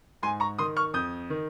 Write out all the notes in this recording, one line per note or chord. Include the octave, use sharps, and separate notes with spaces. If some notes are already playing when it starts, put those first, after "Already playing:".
G#2 G#5 C6
A#5 C#6
D#3 C6 D#6
C#6 F6
F2 D#6 G6
D#3